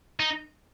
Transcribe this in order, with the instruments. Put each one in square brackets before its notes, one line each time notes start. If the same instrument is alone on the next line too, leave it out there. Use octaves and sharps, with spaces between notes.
[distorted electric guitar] D#4